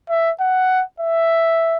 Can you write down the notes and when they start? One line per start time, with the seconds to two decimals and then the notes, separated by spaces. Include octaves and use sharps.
0.09 E5
0.40 F#5
1.00 E5